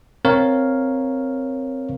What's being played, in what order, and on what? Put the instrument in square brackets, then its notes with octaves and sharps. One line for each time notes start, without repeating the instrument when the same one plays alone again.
[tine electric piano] C4 A#4 C#5 F5